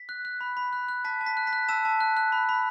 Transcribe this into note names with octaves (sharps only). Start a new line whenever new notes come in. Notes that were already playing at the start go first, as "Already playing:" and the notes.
Already playing: B6
F#6
F#6
B5
B5
F#6
F#6
A5 B6
A5
B6
F#6
B6
F#6
A5 E6 E7
A5
F#6
F#6
B5
B5